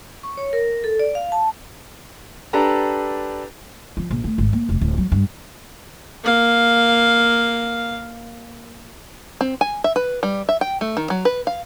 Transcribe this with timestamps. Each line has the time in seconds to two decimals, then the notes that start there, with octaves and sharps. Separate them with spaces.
0.23 C#6
0.37 C#5
0.53 A#4
0.84 A4
0.99 D5
1.15 F5
1.32 A5
2.53 D4 G4 A4 B4 A#5
3.97 F3
4.10 A#1
4.24 A3
4.38 G#1
4.53 A#3
4.69 F1
4.81 D1
4.98 F#3
5.12 G2
6.24 A#3 F5
9.41 C4
9.61 G#5
9.84 E5
9.96 B4
10.23 G3
10.49 E5
10.61 G5
10.81 A3
10.97 D#3
11.10 F#3
11.25 B4
11.47 F5